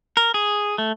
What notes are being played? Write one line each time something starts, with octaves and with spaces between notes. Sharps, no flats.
A#4
G#4
A3